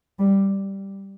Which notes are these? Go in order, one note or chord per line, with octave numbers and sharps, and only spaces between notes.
G3